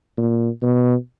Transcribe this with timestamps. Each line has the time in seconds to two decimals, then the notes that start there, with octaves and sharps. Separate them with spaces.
0.18 A#2
0.63 B2